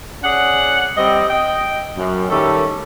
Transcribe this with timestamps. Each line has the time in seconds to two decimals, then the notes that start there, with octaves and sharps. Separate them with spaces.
0.24 C#4 G#4 D5 F#5
0.96 G3 C4 D#5
1.30 D#5 G5
1.96 F#2
2.30 D#3 G3 A3 C#4 A4